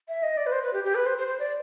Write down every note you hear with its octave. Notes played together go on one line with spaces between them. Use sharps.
E5
D#5
D5
B4
C5
B4
G4
G4
B4
C5
C5
C5
D5